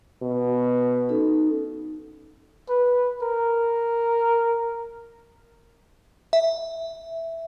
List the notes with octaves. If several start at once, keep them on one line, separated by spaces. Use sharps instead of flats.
B2
C#4 D#4 A4
B4
A#4
E5